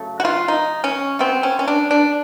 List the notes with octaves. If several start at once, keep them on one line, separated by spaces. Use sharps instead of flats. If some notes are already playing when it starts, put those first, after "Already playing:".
Already playing: C#3 F#3 A3
F#4
F4
D#4
C#4
B2 G3 B3 C4
C#4
C#4
D4
D4